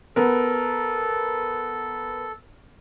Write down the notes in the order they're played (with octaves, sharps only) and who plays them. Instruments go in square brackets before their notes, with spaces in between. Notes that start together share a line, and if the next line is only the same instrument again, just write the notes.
[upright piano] B3 A#4 [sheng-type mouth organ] A4